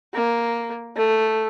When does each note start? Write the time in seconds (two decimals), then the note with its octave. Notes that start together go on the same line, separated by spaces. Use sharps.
0.14 A#3
0.96 A3